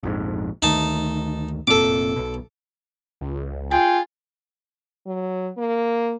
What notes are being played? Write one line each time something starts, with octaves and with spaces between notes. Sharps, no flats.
A#1 F2 G#2
D2 D#3 A3 D#4 A5
F1 A#2 C4 A4 D6
B1 B2
C#2
F4 G#4 G5
F#3
A#3